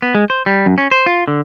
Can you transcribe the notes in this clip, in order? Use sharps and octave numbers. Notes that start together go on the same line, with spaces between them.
B3
G#3
C5
G3
F#2
C#4
C5
F4
D3